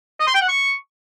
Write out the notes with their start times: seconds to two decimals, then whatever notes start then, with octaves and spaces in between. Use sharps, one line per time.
0.20 D#5
0.27 C6
0.34 G5
0.41 F#5
0.48 C#6